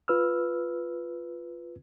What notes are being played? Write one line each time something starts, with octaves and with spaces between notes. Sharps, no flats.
F4 B4 E6 F6